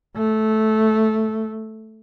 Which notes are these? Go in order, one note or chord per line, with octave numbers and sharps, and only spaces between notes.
A3